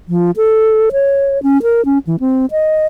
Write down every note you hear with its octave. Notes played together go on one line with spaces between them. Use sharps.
F3
A4
C#5
C#4
A#4
C#4
E3
C4
D#5